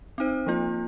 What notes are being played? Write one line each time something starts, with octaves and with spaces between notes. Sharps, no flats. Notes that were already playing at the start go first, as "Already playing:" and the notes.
C4 D#4 C5
F3 A#3 F4